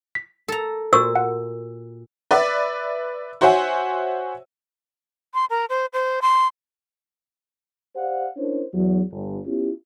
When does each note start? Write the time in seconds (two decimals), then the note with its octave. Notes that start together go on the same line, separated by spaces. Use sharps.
0.15 B6
0.48 A4 A#5
0.93 A#2 F#4 C5 C#6 E6
1.16 F#5
2.31 B4 D5 E5 B5
3.41 F#4 C5 C#5 E5 F#5 G#5
5.34 C6
5.50 A#4
5.69 C5
5.93 C5
6.22 C6
7.95 G4 C5 D5 F5 F#5
8.37 C#4 D4 E4 A#4 C5 C#5
8.73 E2 F#3
9.11 G1
9.46 B3 C#4 E4 F4 G4